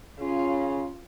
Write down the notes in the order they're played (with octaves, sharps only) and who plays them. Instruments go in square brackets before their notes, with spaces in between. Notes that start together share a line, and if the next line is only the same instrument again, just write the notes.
[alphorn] C#3 [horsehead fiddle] C#4 F4